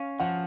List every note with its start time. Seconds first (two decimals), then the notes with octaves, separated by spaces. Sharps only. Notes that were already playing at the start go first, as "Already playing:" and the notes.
Already playing: C#4 F5
0.20 F3 F#5